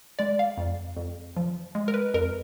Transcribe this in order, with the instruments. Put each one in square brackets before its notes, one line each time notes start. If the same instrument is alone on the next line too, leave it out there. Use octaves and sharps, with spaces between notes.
[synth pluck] G#3 D5
F5
F2
F2
F3
G#3
A#4
B4
F2 A#4